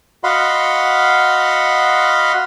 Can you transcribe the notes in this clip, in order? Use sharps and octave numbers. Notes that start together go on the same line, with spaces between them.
F#4 D#5 F5 F#5 B5 C6